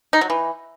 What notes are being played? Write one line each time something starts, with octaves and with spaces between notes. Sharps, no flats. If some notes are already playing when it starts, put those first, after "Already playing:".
D#4
F#3
E3